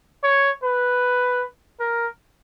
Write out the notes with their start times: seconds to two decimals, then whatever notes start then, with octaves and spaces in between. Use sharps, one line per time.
0.23 C#5
0.63 B4
1.80 A#4